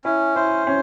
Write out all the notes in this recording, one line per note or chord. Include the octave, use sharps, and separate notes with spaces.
C#4 E4
E4 C5
C#4